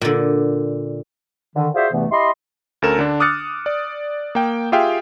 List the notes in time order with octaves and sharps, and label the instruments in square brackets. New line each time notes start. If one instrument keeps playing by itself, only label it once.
[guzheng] A#2 D3
[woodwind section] D3 D#3
F4 F#4 G#4 C5 D5 E5
E2 G2 C3 E3 A3 B3
E4 G4 D#5 B5 C6
[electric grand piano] D2 C#4 A4 A#4 E7
D3 D4
D6 D#6 F6 F#6 A6 C#7
D5
A#3 G5
F4 G4 G#4 E5 F5 G5